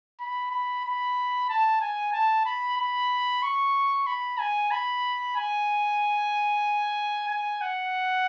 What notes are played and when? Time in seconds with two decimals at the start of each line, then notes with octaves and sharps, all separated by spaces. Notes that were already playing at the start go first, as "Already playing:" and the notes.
0.20 B5
0.51 B5
0.85 B5
1.49 A5
1.81 G#5
2.13 A5
2.46 B5
2.77 B5
3.42 C#6
4.07 B5
4.39 G#5
4.71 B5
5.36 G#5
7.28 G#5
7.61 F#5